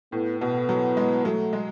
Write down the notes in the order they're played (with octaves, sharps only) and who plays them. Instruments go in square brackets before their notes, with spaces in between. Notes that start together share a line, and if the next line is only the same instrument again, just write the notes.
[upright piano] A2 [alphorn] B3
[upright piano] B2 [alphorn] B3
[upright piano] F#3
G#3
[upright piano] F#3 [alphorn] A3
[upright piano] G#3